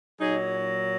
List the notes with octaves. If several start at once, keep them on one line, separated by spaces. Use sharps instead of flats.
A#2 F#3 D#4 G#4